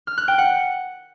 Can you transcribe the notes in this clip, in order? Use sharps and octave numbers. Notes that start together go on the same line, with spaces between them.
F6
F#6
G5
F#5